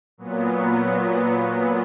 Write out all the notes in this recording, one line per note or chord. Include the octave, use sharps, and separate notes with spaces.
A#2 F#3 B3